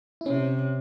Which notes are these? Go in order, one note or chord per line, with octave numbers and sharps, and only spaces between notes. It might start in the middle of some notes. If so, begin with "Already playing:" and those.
E4
C3 C#4